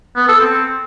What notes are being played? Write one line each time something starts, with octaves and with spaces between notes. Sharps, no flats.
B3
A4
C4